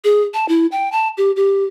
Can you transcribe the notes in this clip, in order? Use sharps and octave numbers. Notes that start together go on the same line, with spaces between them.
G#4
A5
E4
G5
A5
G4
G4